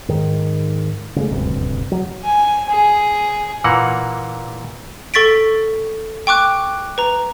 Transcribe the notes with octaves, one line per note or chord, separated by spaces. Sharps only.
G#2 D#3
C#3 G#3 A3
D#1 D2 G2 C3
F#3
G#5
G#4
A#2 E3 A#3 F#5
A4 C#6 A6 B6 D7
G5 C#6 D6 F#6
B4 A#5